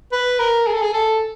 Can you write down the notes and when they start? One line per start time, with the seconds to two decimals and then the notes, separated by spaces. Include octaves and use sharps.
0.12 B4
0.39 A#4
0.67 G#4
0.74 A4
0.82 G#4
0.94 A4